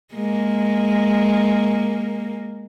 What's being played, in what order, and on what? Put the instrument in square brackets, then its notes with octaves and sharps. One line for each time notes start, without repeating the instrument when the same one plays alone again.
[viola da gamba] G#3 A#3